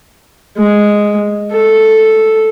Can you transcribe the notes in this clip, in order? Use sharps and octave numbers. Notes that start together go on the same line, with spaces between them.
G#3
A4